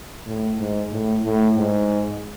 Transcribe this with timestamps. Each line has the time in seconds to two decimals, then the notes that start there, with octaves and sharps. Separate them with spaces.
0.26 A2
0.58 G#2
0.91 A2
1.24 A2
1.56 G#2